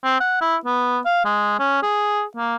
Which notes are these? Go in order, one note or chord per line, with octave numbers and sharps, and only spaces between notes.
C4
F#5
E4
B3
F5
G#3
C#4
G#4
A#3